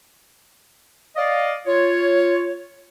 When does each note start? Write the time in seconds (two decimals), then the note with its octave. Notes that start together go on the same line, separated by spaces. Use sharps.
1.16 D5 D#5 F5
1.66 F4 C#5